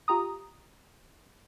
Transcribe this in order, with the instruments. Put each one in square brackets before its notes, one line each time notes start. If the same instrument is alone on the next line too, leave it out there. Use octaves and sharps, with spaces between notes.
[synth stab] F4 G4 A#5 D#6